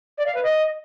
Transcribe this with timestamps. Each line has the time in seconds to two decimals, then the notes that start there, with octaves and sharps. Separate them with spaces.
0.17 D5
0.26 F5
0.35 B4
0.43 D#5